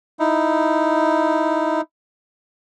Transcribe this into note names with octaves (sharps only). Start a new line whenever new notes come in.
D#4 E4